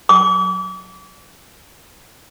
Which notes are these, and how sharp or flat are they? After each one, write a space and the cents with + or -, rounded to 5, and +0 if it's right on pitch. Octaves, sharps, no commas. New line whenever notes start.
D6 -35